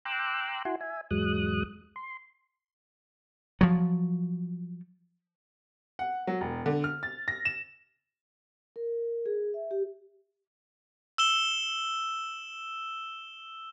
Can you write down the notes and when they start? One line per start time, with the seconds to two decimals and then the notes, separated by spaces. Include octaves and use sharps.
0.05 G5 A#5 C6 D6 E6 F#6
0.65 E4 F#4 F#5 G#5 C6
0.81 E5 G#5
1.11 E2 G#2 F#3 G#3 D#6 F#6
1.96 C6
3.61 F3 F#3
5.99 F#5
6.27 F#3
6.41 E1
6.66 D3
6.84 F6
7.03 A6
7.28 A#6
7.45 E7
8.76 A#4
9.26 G#4
9.54 E5
9.71 G4
11.18 E6 E7 G7